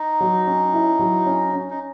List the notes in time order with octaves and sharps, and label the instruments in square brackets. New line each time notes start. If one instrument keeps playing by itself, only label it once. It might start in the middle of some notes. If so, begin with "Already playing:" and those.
Already playing: [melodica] D#4
[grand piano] F#3
C#4
E4
F#3
C#4
C#4
[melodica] D#4